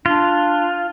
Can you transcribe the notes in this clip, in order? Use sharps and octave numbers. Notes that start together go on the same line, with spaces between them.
D4 F4